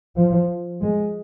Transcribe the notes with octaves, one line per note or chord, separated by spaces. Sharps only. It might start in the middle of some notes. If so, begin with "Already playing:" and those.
F3
G#3